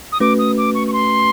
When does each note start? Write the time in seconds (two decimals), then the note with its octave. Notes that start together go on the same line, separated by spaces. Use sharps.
0.12 D#6
0.20 A3 C#4 F#4 B4 D6
0.39 D#6
0.58 D6
0.75 C#6
0.88 C#6
0.93 C6